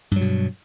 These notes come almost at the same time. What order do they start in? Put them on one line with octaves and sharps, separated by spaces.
G2 F#3 B2